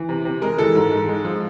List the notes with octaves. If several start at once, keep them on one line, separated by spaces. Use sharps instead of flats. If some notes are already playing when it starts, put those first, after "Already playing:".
Already playing: E3
C3
C3
G#3 A#4
E3 A4
G#2
G#2
G#3
F3